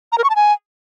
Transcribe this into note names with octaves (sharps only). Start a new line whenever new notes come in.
A#5
A#4
C#6
A5
G#5